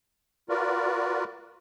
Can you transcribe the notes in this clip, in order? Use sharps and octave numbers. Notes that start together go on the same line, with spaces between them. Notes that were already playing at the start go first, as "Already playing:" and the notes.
F4 F#4 A#4 B4 D5